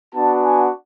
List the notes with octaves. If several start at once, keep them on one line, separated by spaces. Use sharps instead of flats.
B3 D4 F#4 A5
G#5